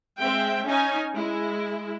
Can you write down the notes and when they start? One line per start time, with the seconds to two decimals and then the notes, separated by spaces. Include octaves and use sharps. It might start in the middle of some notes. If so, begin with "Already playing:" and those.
0.18 G#3 C4 E5 G5
0.64 C#4 D#4 G#5
1.15 G#3 E4